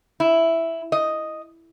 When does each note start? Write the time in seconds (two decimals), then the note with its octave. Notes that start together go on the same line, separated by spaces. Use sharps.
0.20 E4
0.92 D#5